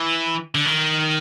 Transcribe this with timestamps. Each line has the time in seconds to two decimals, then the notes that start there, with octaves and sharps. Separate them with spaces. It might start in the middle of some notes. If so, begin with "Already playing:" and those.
Already playing: E3
0.55 D3
0.65 D#3